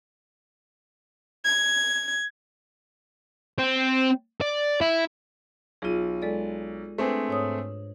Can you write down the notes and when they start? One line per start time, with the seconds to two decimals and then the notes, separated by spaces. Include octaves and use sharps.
1.44 G#6
3.58 C4
4.41 D5
4.81 E4
5.82 B1 F4 G#4 D#7
6.22 G#3 A4 D5
6.98 A3 C4 D4 G#4 B4 C5
7.28 G#2 C#5 D#6